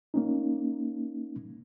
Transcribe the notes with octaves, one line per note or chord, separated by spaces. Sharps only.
A#3 C#4 D#4